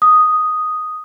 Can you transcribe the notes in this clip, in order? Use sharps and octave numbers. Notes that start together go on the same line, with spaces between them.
D#6